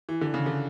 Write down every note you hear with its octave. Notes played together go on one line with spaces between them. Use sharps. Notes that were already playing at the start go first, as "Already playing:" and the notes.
E3
D3
C#3
D3